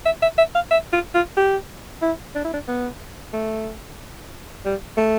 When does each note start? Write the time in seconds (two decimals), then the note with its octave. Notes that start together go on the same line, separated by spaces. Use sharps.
0.06 E5
0.22 E5
0.38 E5
0.55 F5
0.71 E5
0.93 F4
1.15 F4
1.37 G4
2.02 E4
2.35 D4
2.44 E4
2.53 D4
2.68 B3
3.33 A3
4.65 G3
4.97 A3